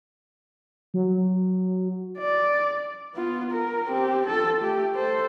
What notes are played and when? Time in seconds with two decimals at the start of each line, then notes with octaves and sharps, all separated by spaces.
0.94 F#3
2.18 D5
3.15 B3 F4
3.52 A#4
3.87 C4 G4
4.27 F4 A4
4.61 A3 G4
4.95 A4 C5